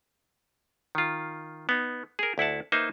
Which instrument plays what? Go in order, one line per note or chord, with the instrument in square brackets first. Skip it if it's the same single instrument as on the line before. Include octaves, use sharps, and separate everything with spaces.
[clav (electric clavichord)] D#3 F4
B3 D#4
G#4 A#4
D2 E4 F#5 A5
A#3 D#4 B4 C5 E5